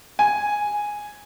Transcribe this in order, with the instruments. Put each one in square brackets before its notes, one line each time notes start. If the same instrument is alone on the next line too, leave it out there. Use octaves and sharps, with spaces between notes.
[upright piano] G#5